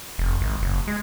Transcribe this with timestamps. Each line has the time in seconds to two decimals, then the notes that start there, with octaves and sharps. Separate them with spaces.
0.18 F1
0.41 G#1
0.62 F#1
0.88 G#3